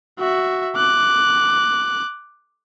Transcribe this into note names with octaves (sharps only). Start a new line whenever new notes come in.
F#4 E5
D6 F#6